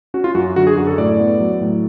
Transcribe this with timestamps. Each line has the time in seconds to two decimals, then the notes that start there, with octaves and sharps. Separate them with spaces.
0.14 C#4 F#4
0.24 F4
0.35 F#2 F#4
0.56 D3 F#4
0.67 G#4
0.77 F#2 F#4
0.87 A4
0.98 A2 D5
1.20 B3
1.40 F#3
1.61 A2